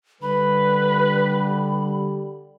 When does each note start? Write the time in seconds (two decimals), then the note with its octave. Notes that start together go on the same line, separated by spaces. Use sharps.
0.22 D3 G3 B4 B5